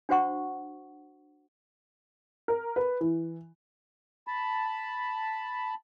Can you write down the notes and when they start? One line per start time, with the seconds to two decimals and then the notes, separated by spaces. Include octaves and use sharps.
0.09 D4 F#4 C5 F#5 C#6
2.48 A#4
2.76 B4
3.01 E3
4.27 A5 B5